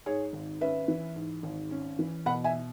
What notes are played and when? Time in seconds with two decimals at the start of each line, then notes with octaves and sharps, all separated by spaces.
0.06 G#2 G#4 C#5
0.33 G#1
0.61 C#4 B4 E5
0.88 E3
1.16 G#2
1.43 G#1
1.71 C#4
1.99 E3
2.26 B2 F#5 B5
2.44 E5 G#5